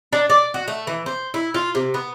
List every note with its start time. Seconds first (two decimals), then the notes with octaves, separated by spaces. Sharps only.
0.13 D4
0.30 D5
0.54 F#4
0.68 A3
0.87 E3
1.06 C5
1.34 E4
1.54 F4
1.75 C3
1.94 B3